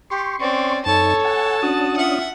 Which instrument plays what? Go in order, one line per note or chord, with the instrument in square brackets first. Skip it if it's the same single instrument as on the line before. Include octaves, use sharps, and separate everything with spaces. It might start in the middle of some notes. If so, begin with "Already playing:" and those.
[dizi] G4 [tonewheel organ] C6 C#6
[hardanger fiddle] C4 [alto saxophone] C#4 [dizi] D5
[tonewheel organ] F#2 D#4 [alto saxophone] A4 [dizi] C#5 [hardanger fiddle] A5
[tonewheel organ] F#5 G#5 [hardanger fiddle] A5
[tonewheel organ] C#4 D4 D#6 [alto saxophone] F#4
[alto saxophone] F4 [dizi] E5 [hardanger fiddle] F#5